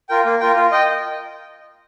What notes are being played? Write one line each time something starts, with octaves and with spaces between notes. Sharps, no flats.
F4 A#4 G5
A#3
F4 A#4 G5
F4
D#5 G5